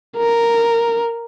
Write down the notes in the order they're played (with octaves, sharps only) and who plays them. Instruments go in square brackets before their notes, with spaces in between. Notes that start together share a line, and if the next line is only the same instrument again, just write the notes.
[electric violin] A#4